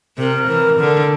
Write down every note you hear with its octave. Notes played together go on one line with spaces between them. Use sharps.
C3 A#4
E3
D3